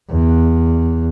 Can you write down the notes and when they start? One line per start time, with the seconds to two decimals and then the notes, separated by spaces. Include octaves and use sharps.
0.10 E2